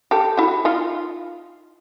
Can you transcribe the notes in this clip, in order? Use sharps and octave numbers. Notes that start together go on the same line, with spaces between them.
G4 A4
E4 F#4
D#4 F4